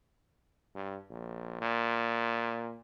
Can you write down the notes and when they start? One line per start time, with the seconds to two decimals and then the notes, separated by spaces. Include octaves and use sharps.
0.75 G2
1.10 A#1
1.61 A#2